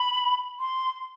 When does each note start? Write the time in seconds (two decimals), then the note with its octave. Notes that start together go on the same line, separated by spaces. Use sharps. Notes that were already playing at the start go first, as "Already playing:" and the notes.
Already playing: B5
0.60 C6